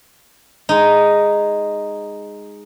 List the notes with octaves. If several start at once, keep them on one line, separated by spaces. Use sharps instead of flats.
G#3 D#4